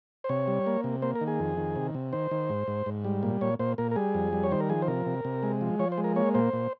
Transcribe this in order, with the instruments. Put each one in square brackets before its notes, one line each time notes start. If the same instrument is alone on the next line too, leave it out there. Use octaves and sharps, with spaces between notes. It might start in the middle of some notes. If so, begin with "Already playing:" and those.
[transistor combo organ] C5
C3 C#5
G3
A#3
C3
A#3 C5
A#4
D#3
G#4
F2
D#3
C3
C3
D#3 C5
D#3
G#2
G#2
G#2
G3
A#2
A#2 C#5
A#2 C5
A#2 A#4
A#4
G3 G#4
F2
G3
C#5
D#3 C5
A#4
F3 G#4
C5
C3 A#4
C3
C3
G#3
F3
F3 C#5
C5
G#3
A#4
A#3 C#5
A#2 C5
A#2